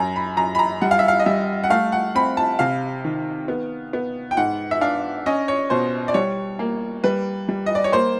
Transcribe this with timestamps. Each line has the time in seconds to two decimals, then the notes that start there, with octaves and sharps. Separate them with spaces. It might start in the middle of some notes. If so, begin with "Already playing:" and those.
Already playing: F#2 A#5
0.16 B5
0.37 F#2 A#5
0.55 B5
0.59 A#5
0.81 G3 F#5
0.91 F5
0.99 E5
1.08 F5
1.20 D#5
1.26 G3 E5
1.64 F#5
1.70 A3 F5
1.92 F#5
2.15 C4 B5
2.37 A5
2.59 C3 F5
3.05 D#3
3.48 B3
3.93 B3
4.31 G5
4.37 G#2 F#5
4.71 E5
4.81 D4 F5
5.26 C#4 D#5
5.48 C#5
5.70 B2 C5
6.08 D5
6.14 G3 C#5
6.59 A#3
7.04 G3 B4
7.49 G3
7.66 D#5
7.75 D5
7.84 C#5
7.92 A#3 C5